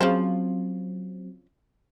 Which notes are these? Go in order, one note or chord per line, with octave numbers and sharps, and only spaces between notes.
C#3 F3 F#3 C4 C5